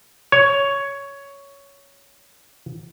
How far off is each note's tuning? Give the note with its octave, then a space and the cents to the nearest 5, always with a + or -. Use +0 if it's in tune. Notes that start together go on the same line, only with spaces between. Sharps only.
C#5 +10